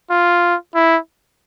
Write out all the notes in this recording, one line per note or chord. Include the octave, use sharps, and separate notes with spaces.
F4
E4